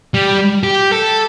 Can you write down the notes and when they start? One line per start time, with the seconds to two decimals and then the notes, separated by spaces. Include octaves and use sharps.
0.14 G3
0.63 G4
0.91 A4